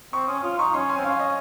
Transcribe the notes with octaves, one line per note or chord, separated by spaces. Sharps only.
C4 C#6
C#4 D#6
F4 D#6
D#4 C#6
C#4 C6
G#5
C4
C#4 F5
D#5